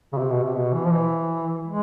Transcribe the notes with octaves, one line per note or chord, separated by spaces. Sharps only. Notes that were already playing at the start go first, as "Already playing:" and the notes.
C#3
C3
B2
C3
B2
E3
F3
E3
G#3